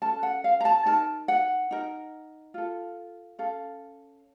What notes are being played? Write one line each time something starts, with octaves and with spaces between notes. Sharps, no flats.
C#4 A4 A5
F#5
F5
A#5
A5
D#4 A#4 A5
F#5
D#4 A#4
F4 A4
C#4 A4 F5